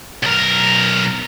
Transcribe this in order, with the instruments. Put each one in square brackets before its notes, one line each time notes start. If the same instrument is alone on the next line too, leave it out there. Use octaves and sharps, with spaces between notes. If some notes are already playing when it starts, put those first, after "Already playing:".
[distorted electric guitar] B1 A#4